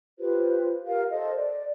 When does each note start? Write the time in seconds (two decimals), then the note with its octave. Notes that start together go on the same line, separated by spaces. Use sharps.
0.19 F4 G4 B4 C5
0.86 G4 A#4 F5
1.11 A4 C5 D#5
1.36 D5